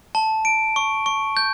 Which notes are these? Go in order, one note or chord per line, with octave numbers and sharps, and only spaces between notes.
A5
D7
C#6
C#6
G6